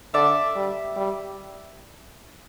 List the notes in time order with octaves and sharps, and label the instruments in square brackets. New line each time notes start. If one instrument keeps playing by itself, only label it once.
[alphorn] D3 [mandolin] D5 E5
[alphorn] G3
G3